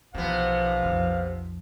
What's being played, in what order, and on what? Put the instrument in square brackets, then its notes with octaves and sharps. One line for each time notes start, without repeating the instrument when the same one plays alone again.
[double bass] B1 F3 [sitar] C3 B3 [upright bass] E3 [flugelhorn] F5
[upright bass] F2